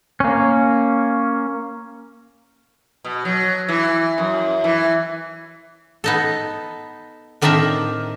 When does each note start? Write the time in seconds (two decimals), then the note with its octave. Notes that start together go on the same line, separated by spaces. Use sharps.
0.20 A#3 C#4
3.05 B2
3.25 F#3
3.69 E3
4.18 F#2
4.64 E3
6.04 B3 D#4 A4
7.42 A2 D#3 C4 D4 A#4 E5